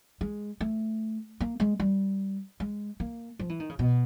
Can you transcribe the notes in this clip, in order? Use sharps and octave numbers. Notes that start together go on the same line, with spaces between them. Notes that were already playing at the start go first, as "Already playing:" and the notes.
G#3
A3
A#3
G#3
G3
G#3
A#3
F3
E3
D#3
C#3
B2